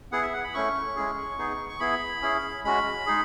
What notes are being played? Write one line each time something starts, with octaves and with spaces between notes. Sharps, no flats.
B3 E4 G#4 F#5
E5
F#5
B5
A3 C#4 E4 C#6
G#3 C#4 E4 G#4
B3 D#4 G#4
C#6
B3 E4 G#4 B5
C#4 E4 G#4
G#3 C#4 F#4 B5
G#3 D#4 G#4